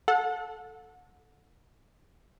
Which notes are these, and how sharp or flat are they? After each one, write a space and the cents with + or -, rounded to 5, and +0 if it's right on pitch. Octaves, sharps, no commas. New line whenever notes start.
A4 +0 F#5 -30